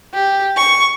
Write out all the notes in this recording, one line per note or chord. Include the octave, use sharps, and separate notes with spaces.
G4
C#6